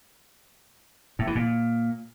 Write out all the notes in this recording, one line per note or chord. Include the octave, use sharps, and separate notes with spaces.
A2
E3
A#2